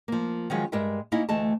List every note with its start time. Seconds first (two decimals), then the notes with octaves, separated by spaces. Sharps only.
0.08 F3 A#3
0.50 D#3 F3 F#3 G#3 C#4
0.72 G2 G3 G#3 A#4 E5 G5
1.12 A#3 C#4 D#4 E4 D#5 E5
1.29 D2 E3 A3 D#5 A5